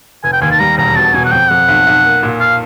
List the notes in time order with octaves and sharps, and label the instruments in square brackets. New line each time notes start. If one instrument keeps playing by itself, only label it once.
[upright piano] F1 [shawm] G#5
[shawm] G5
[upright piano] D#2 [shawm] G#5
[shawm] A5
[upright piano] G3 [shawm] A#5
[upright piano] E1 [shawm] A#5
[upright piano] B2 [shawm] A5
[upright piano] B2 [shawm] G#5
[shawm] F#5
[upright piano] F2 [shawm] G5
[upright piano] F2 [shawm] F#5
[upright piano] B1
B1
A#3
A#2
[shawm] F5